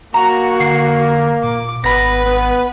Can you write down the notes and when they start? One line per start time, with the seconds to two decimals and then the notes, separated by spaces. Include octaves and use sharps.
0.14 A#3 F#4 A#5
0.60 D3 C7
1.44 A#2 D6
1.84 G#1 B3 B4 B5 A#6
2.25 B3